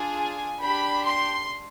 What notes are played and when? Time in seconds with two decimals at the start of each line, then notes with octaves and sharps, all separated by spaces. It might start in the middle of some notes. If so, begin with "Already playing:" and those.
Already playing: D4 F4 G#4
0.18 G#5
0.60 D4 G4 B5
1.03 C6